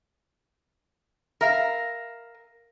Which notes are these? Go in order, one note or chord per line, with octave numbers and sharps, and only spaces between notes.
A#4 E5 F5